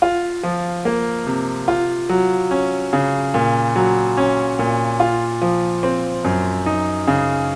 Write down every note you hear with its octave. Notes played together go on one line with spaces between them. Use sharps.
F4
F3
A#3
C3
F4
F#3
C#4
C#3
A#2
F#3
C#4
A#2
F4
F3
C4
F#2
D#4
C#3